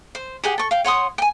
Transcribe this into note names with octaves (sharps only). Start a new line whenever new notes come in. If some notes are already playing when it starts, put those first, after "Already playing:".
C5
G4 G#4 F#5 G5
A4 C#6
F5 G5
C#5 F#5 C6 D#6
G5 G#5